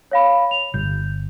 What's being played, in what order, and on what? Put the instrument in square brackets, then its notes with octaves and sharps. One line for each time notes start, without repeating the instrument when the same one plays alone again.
[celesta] C#5 F5 B5
F7
[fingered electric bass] G1 [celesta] G6